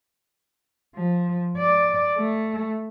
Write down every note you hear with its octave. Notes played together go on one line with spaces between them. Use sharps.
F3
D5
A3